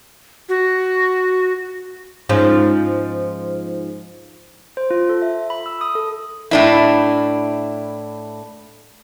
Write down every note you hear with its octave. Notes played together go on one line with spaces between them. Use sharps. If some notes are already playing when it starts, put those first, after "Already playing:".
F#4
G#2 F3 C#4
C5
F4
A4
E5
B5
E6
D#6
A4
A2 D4 E4